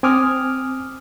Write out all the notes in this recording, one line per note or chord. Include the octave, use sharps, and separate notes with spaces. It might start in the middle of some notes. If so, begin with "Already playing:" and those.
C4 G#5 D6 D#6 F6